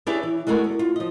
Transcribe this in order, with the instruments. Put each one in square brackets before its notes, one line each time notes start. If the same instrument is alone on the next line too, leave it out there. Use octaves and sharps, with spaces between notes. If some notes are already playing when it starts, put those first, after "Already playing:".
[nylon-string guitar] D4 E4 G4 G#4 B4 C#5
E3
G#3 A3 F#4 G#4 A#4
E2
F4
F3 D#5